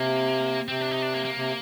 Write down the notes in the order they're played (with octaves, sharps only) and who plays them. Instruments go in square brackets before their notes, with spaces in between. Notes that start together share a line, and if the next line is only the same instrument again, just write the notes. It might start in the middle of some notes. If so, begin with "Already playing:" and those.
Already playing: [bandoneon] C3 [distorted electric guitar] A#3
[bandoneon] C3 [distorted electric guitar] C4
[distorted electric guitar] D4
D#4
D4
A#3
A#3
[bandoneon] C3